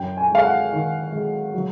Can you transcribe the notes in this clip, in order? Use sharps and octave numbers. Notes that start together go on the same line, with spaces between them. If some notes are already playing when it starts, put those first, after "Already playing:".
Already playing: F#2 G5
G#5
G#3 F5
F#5
D#3
G#3
F#3